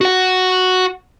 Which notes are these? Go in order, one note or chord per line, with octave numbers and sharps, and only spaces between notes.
F#4 F#5